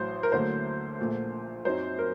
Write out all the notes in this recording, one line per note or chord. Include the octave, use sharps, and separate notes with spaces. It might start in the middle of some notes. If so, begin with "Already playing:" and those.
Already playing: A1 A2 F#3 C5
A#4
D2 D3 F#3 A#3 C5
A#1 A#2 A3
F#2 F#3 C4 D#4 C5
A#4